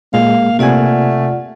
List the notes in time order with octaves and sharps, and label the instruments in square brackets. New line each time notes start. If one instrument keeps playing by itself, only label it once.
[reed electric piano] A#2 G#3 [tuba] A#3 [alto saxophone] F5
[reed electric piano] C3 G#5 [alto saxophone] A3 [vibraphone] F4 D5 F#5